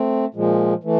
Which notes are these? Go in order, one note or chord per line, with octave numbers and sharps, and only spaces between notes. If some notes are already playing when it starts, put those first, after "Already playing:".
Already playing: A3 C4
A#2 F3 G#3
E3 A3